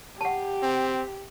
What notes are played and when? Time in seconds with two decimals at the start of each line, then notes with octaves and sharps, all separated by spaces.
0.21 G4 F#5 A5
0.63 C4